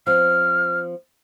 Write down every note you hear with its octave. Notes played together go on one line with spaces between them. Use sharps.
F3 C4 F6